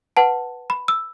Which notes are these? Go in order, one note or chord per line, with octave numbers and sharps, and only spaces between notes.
B4 F#5 A5
B5
E6